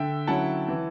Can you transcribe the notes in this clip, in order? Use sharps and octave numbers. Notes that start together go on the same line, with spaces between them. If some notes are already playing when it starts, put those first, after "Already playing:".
Already playing: D3 E5 G5
F#3 C#4 E4 F#5 A5
E3